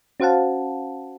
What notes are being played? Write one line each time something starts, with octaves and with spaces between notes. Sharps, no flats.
C#4 F#4 C5 F5 F#5 A5